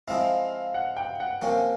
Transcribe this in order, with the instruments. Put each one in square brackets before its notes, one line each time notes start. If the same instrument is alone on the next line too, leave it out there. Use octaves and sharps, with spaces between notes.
[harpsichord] F3 G#3 C4 E4 [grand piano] F5
[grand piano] F#5
G5
F#5
[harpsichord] C3 F3 A#3 C#4 [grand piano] G5